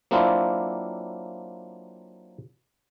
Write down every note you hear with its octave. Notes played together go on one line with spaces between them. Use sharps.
F#3 A#3 C4 D4 E4 F4